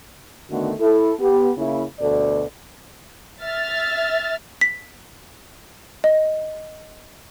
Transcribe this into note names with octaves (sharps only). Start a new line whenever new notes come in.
D3 D#3 A3 B3 F#4
E4 A4
B3 G4
C#3 A#3 E4
D2 B2 A4 D5
E5 F6 A6
B6
D#5